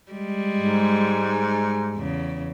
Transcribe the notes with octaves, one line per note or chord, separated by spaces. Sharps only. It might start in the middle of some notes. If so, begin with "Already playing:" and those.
G3 G#3
G#2
E2 C#3